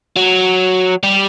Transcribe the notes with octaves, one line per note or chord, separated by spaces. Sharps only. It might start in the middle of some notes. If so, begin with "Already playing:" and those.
F#3
G3